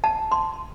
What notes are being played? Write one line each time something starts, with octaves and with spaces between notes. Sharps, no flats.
A5
C6